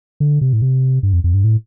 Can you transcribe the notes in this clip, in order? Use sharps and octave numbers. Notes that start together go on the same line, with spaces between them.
D3
C3
A2
C3
G2
F2
F2
G2
A2